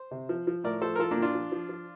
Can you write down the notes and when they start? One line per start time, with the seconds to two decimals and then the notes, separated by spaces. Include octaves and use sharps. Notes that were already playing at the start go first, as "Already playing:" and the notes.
Already playing: C5
0.11 C3
0.29 F3
0.47 F3
0.64 A2 A#4 D5
0.82 F3 A4 C5
0.95 A#4
0.99 F3 F4 A4
1.11 A#3 D4
1.17 A#2
1.22 D4 F4
1.35 F3
1.52 F3
1.69 F3